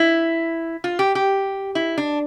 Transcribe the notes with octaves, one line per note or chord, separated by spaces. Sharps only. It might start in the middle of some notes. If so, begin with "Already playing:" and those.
Already playing: E4
F4
G4
G4
E4
D4